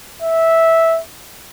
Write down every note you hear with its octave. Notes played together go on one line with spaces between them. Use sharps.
E5